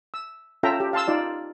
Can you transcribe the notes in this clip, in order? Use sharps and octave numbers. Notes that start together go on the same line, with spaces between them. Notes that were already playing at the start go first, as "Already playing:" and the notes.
E6
C#4 F4 A4 E5 G5 A#5
G4
F5 A5 C6 E6
D#4 F4 D5